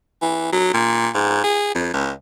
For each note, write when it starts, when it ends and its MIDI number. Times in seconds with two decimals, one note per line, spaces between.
0.22 0.50 52
0.52 0.72 54
0.74 1.08 46
1.14 1.40 44
1.44 1.70 68
1.74 1.92 41
1.94 2.11 37